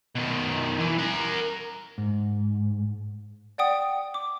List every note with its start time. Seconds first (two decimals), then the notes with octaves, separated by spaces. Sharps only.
0.15 B2 D#3
0.80 E3
0.99 A#4 F#5
1.98 G#2
3.58 D5 F#5 G5 D#6
4.14 D6